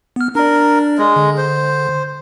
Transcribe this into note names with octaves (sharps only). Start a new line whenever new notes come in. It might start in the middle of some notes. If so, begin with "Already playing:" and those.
B3 F6
D4 A#4 D5
G#3
D3
C5